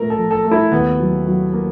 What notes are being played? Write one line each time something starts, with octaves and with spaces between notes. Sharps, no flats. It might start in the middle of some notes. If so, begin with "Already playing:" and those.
Already playing: A#2 A3 A#4
A4
F3
A4
A3
E4
D#2 B3
F#3
F#3
A#3